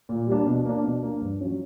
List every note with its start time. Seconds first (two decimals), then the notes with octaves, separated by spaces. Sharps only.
0.09 A#2
0.27 G3 A#3 D4
0.47 B2
0.65 A#3 D4
0.84 B2
1.03 A#3 D4
1.21 G2
1.40 F#3 C#4